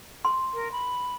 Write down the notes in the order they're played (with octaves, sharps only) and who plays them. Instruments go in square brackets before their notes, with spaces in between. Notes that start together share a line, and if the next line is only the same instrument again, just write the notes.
[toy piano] C6
[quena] A#4
B5